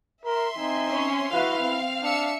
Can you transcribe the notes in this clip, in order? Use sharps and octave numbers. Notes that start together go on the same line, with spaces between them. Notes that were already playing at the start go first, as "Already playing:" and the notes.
A#4 E5 C6
C4 D#4 G#5
C#4
E4 F#4 B4 F5
C4
D4 E5 E6 C#7